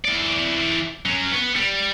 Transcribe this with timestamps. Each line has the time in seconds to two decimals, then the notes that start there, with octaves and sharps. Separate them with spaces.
0.05 E3 D5
1.06 F#3 C#4
1.32 B3
1.56 G3